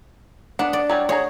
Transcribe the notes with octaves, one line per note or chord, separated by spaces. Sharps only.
B3 D4 F#5
D5
F#3 G3 G#5
F#4 G#4 C#5 A#5